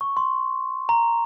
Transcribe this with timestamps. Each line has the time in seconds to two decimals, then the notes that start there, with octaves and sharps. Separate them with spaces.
0.01 C#6
0.17 C6
0.89 A#5